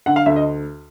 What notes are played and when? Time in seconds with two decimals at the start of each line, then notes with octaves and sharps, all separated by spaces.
0.06 D3 F#5
0.16 F5
0.26 D2 E5
0.36 D#5